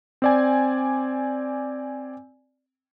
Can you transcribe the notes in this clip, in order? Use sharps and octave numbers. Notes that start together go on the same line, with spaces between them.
C4 D5 G#5